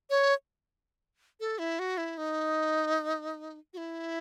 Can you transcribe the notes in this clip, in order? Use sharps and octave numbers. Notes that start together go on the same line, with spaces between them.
C#5
A4
E4
F#4
E4
D#4
F#4
E4